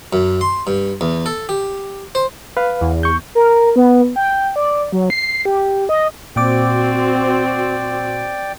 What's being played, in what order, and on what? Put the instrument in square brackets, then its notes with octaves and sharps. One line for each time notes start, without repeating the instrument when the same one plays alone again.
[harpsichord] F#2
C6
G2
E2
A4
G4
C5
[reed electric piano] B4 F5
[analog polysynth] E2
[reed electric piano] C#6 G6
[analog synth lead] A#4
B3
G5
D5
F#3
C7
G4
D#5
[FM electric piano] A#2 D6 [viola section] C4 F#4 [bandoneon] D5 G5